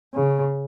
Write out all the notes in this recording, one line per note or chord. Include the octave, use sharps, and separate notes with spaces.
C#3